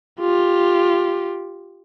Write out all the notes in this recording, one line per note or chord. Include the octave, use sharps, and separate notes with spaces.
F4 G4